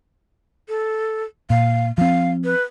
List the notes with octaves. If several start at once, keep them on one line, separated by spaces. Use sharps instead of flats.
A4
A#2 F5
F3 C4 F5
B4